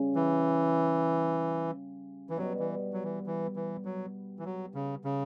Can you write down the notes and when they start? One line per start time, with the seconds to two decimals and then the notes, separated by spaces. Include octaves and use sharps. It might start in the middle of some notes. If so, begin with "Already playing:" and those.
Already playing: C#3 G3 C#4
0.15 E3
2.30 E3
2.37 B2 F#3 G3 B3 F#4
2.59 E3
2.93 F#3
3.04 E3
3.26 E3
3.56 E3
3.85 F#3
4.39 E3
4.45 F#3
4.74 C#3
5.05 C#3